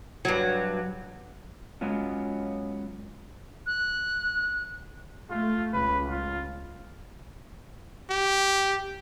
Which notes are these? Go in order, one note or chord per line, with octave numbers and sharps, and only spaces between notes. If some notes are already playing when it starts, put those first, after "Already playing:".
G2 F#3
F#3 G#3 B3 C#4 F4
F#6
A3 F4
C#2 B4
F4
G4